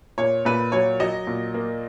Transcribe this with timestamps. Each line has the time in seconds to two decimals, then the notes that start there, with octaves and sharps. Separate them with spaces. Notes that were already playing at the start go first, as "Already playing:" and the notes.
0.18 A#2 C#5
0.45 A#2 B4
0.72 F#3 C#5
1.00 F#3 D#5
1.27 A#2
1.54 A#3